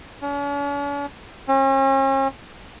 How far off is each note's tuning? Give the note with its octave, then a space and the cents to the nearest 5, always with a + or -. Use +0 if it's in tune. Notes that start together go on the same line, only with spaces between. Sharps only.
C#4 +45
C#4 -40